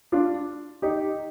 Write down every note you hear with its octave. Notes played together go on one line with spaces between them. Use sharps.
D4 F4
D#4 G4